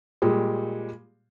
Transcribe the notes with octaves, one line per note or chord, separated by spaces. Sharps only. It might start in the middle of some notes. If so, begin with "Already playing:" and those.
A#2 G3 G#3